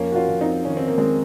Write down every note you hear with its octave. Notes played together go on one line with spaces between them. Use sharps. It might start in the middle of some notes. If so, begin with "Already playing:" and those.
Already playing: F2 A#3 C#4
F#4
C#4 F4
F2
C4 D#4
D#3 C#4
C4
A#3
D#3 G#3 C4